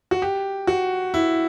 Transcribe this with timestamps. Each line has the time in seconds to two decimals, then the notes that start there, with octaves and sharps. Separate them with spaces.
0.11 F#4
0.22 G4
0.67 F#4
1.14 E4